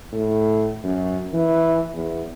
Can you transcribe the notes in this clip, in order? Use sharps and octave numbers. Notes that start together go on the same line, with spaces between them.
A2
F#2
E3
E2